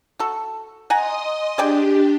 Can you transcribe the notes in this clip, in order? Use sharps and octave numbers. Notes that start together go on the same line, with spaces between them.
F#4 A4
D#5 F#5 G#5 A#5 C6 D#6
D4 G4 G#4 D5 G5